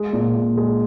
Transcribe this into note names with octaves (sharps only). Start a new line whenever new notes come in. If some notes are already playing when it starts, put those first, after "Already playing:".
Already playing: G#3
A#2
A#2
G#3